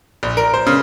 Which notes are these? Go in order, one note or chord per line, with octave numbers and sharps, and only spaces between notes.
A#1
A#4
C5
C#3